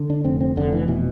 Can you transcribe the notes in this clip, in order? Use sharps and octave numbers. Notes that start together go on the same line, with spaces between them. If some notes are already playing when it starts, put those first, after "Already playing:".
Already playing: D3
D4
F1 C4
C4
F1 D3
E3
B2 E3